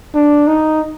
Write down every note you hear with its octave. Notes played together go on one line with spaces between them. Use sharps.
D4
D#4